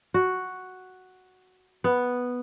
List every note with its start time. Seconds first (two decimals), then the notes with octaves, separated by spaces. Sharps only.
0.14 F#4
1.84 B3